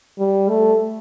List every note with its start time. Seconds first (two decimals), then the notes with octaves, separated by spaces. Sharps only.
0.19 G3
0.49 A3